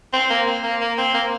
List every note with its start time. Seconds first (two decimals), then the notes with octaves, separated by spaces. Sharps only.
0.13 C4
0.30 A#3
0.47 C4
0.64 A#3
0.81 A#3
0.98 C4
1.14 A#3